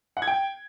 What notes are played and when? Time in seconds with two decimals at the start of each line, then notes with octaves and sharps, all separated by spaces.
0.17 F#5
0.22 G#6
0.27 G5